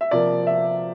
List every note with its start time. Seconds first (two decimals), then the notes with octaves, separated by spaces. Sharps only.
0.01 E5
0.11 C3 F3 A#3 D5
0.47 E5